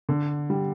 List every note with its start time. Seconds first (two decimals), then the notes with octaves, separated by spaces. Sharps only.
0.09 D3
0.50 G3